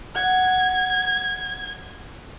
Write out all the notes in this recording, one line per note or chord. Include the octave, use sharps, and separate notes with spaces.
F#5 G#6